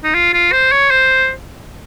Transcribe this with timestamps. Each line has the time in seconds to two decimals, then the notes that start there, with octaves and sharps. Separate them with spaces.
0.04 D#4
0.14 F4
0.34 F4
0.52 C5
0.72 C#5
0.91 C5